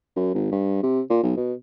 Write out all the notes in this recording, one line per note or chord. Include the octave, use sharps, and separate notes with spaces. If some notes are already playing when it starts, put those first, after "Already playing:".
F#2
G#1
G2
C3
A#2
B1
B2